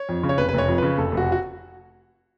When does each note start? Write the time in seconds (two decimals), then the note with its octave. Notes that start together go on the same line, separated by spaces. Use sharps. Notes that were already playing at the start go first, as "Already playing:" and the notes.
Already playing: C#5
0.09 F2
0.23 C#3
0.29 C#5
0.38 F1 B4
0.49 B4
0.54 F1 C#5
0.68 F2
0.78 C#3 B4
0.98 F1 A4
1.12 F1
1.17 F#4
1.32 F#4